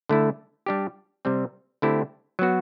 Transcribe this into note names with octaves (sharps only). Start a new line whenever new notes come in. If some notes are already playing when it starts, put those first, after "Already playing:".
D3 A3 E4
G3 D4 G4
C3 G3 C4
D3 A3 C4 E4 G4
F#3 B3 F#4